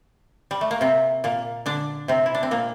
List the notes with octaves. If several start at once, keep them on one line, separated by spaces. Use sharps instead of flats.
G3
A3
A#3
C3 C4
A#2 A#3
D3 D4
C3 C4
E4
D4
C4
A#2 A#3